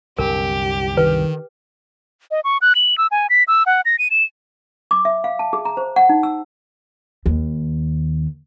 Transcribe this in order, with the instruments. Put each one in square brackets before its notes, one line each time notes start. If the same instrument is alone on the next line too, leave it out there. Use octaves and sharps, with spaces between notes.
[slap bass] C2 F#2 D3 [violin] G4 [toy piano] A#4
[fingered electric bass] D#3 [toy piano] B4
[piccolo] D#5
C#6
F#6
F#7
E6
G#5
B6
E6
F#5
A#6
D#7
E7
[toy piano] D6
E5
F5
A5
G#4
A#5
C5
F#5
D#4
E6
[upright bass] D#2